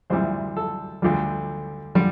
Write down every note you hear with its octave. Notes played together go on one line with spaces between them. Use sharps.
D2 C3 E3 G3 C5
A4
D2 D3 G3
D3 G3